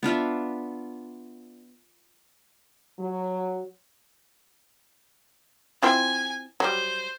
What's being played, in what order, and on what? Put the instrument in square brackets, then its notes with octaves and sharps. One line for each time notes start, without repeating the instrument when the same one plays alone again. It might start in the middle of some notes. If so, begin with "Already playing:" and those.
[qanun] B3 D4 F4 E5
[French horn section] F#3
[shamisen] C4 E4 F4 [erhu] G#5
[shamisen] F#3 G3 [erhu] C5